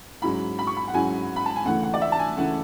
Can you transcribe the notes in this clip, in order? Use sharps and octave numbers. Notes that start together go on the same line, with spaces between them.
G#2 F#3 C#4 E4 B5
B5
C#6
B5
F#5
G#2 F#3 C#4 E4 G#5
B5
A5
G#5
D2 C#3 E3 A3 C#4 F#5
F#5
D5
E5
A5
G#5
D2 C#3 E3 A3 C#4 F#5